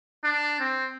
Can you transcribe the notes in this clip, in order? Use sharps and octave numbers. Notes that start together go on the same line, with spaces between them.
D4
C4